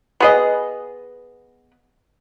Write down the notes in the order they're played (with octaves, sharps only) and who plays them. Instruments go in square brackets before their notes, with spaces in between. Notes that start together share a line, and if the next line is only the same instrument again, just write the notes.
[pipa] B3 G#4 D#5